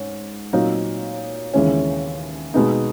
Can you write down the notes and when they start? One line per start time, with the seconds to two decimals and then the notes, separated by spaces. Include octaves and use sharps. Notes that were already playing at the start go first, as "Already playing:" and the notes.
Already playing: G#2 C#4
0.53 A#2 F#3 A#3 D#4
1.54 D#2 C#3 E3 G#3 C#4
2.54 B2 G#3 B3 D#4